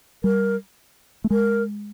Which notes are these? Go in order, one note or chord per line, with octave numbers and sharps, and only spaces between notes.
G3 A#4
A3
G#3 A#4